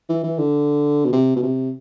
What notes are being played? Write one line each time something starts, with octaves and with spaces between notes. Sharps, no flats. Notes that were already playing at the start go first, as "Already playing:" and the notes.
E3
E3
D3
B2
C3
B2
C3